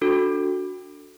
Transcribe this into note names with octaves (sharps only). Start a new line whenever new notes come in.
D4 F#4 A4